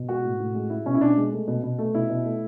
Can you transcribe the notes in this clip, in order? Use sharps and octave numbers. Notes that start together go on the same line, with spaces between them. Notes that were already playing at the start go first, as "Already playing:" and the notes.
Already playing: B2
G#3 F#4
A2
A2
G#3
G#3 E4
B2 C#4
E4
B2 D4
G#3
A3
B2
B2
A3
B2 E4
B2
A3